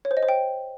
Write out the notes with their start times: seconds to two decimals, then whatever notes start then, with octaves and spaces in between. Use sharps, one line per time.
0.05 C#5
0.11 C5
0.17 D#5
0.23 C5
0.29 G5